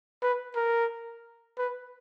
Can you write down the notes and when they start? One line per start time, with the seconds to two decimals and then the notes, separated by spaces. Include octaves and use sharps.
0.22 B4
0.55 A#4
1.58 B4